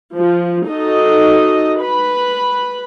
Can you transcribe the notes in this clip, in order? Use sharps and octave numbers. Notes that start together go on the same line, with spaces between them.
F3
D#4 F#4 A4 D#5
B4 B5